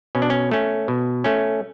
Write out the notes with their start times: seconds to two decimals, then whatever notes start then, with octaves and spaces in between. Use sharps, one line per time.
0.15 B2 C#4
0.22 D4
0.30 C#4
0.51 A3 C#4
0.88 B2
1.24 A3 C#4